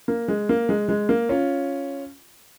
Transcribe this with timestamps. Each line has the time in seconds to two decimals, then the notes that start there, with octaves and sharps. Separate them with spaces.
0.08 A#3
0.28 G#3
0.49 A#3
0.69 G#3
0.88 G#3
1.09 A#3
1.29 C#4 F4